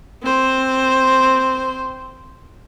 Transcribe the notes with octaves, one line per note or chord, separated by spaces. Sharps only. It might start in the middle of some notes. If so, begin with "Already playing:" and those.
C4 C5